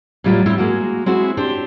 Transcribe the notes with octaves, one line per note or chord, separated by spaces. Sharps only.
A2 F#3 G3 F4
A2 G3 C4 E4
G#3 A#3 F#4
G#3 C4 E4 F#4
C4 D4 G4 C5